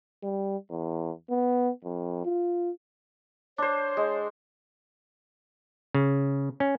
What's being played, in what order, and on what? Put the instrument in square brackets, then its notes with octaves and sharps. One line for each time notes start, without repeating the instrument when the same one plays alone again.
[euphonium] G3
E2
B3
F2
F4
[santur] D4 C5 [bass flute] C#5
[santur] G#3
[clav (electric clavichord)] C#3
C#4